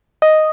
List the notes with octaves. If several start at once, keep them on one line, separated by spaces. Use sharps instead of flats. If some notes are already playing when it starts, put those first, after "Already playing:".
D#5